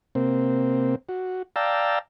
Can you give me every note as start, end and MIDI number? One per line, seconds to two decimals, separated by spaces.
0.15 0.95 48
0.15 0.95 58
0.15 0.95 60
1.09 1.42 66
1.56 1.99 74
1.56 1.99 77
1.56 1.99 79
1.56 1.99 81
1.56 1.99 82
1.56 1.99 88